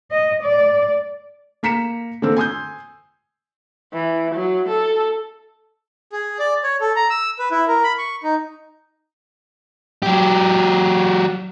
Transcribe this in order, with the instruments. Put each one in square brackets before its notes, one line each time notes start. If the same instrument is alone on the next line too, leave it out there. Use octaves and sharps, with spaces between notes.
[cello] D#5
D5
[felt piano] A#3 A#5 B6 C#7 E7
D3 A#3 C4 E6
G#5 C6 D#6 G6
[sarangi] E3
F#3
A4
[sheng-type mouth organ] G#4
D5
C#5
A4
A#5
E6
B4
E4
A#4
B5
C#6
D#4
[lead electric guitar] F#3 G4